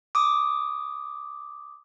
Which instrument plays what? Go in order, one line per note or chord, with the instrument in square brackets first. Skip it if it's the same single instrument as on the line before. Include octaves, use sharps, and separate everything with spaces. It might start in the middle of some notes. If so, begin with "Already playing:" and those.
[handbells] D6 D#6